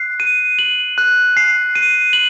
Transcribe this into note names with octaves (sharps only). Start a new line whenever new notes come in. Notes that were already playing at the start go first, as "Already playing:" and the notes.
Already playing: F#6 C7
D#7
F#7
F#6
C7
D#7
F#7